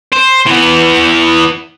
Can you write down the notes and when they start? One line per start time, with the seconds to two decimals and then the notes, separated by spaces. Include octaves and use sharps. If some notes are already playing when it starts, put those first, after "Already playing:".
0.13 C5
0.46 E3 B3